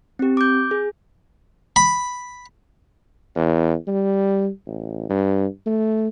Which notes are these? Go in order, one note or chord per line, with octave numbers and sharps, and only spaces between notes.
C4 G4
D6 G6
G#4
B5
E2
G3
A1
G2
A3